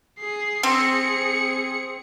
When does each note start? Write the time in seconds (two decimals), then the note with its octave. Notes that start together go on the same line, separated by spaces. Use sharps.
0.19 G#4 C7
0.63 C4 G#4 C#7